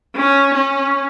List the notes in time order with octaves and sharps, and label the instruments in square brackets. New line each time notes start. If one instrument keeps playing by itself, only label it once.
[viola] C#4
C#4